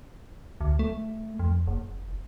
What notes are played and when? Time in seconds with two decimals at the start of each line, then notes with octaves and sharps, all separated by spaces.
0.61 D2
0.79 A3
1.39 F2
1.67 F#1